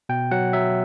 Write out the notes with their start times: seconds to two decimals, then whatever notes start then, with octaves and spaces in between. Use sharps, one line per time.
0.09 B2 G5
0.31 F#3 F#5
0.53 F#3 E5